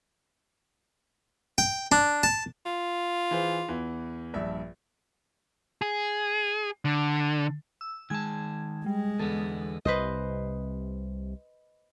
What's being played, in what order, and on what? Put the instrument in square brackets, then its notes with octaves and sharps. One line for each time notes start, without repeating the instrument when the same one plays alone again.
[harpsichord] G5
D4
A5
[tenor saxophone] F4
[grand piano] E3 G#4 C5
E2 E3
A#1 G2 E5
[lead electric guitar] G#4
D3
[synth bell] E6
[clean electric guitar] D#3 A5 [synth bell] G#3 G#6
[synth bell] G3 [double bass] G#3
[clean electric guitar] E2 D3 B3 [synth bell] A4
[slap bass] C2 C3 [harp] B4 C5 D#5